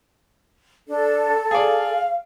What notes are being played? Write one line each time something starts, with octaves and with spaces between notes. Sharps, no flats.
D4 A4
G#4 D5 F5